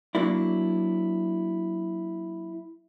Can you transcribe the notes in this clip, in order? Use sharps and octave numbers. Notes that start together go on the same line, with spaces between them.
F#3 A#3 D4 E4